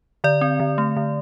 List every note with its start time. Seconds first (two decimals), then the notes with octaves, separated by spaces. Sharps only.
0.24 D3 D5
0.41 C4
0.60 D3
0.78 A3
0.97 D3